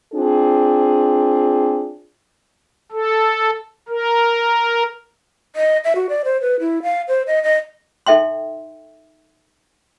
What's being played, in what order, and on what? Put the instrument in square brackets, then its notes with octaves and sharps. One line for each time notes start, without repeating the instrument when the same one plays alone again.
[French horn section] C4 D4 F4 G#4
[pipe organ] A4
A#4
[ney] D#5
E5
F#4
D5
C5
B4
E4
F5
C5
D#5
D#5
[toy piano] D#4 A4 E5 G5 C6